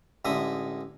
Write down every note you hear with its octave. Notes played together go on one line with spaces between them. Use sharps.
A1 D3 G#3 E5 D#6